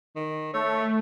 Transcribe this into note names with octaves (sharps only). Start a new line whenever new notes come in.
D#3
A3 C#5